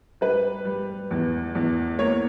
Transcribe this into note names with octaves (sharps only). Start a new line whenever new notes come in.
G3 B4
G3
E2
E2
A#3 C#5